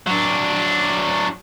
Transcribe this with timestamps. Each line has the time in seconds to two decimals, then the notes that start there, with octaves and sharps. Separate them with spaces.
0.07 F#3 D4